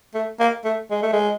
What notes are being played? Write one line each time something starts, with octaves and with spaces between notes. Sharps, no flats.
A3
A#3
A3
G#3
A3
G#3